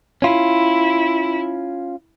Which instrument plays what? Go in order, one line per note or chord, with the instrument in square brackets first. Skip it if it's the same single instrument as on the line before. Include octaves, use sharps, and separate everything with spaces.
[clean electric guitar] C#4 F4 [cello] E4